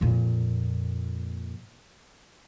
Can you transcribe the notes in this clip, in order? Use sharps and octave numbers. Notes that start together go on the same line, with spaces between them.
F2 A#2